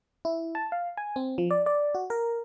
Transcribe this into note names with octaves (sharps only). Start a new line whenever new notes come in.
E4
A5
F5
G#5
C4
F3
D5
D5
F#4
A#4